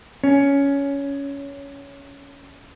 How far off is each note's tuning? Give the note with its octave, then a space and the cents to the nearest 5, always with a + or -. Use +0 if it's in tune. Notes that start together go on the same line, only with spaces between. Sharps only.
C#4 +15